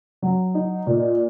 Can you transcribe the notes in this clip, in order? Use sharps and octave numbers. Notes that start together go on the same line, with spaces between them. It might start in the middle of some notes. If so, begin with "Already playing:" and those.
F#3
D#4
A#2